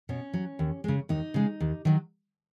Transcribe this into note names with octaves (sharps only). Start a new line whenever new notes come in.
B2 C#4
F#3
D#2
C#3 G#3
D#2 D#4
C#3 G#3
D#2
D#3 F#3